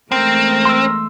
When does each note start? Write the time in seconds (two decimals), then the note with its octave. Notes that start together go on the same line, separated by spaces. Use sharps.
0.12 E2 G#3 A3 C4 A#4
0.65 C6 E6